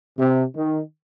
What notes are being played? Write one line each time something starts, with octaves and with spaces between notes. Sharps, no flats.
C3
D#3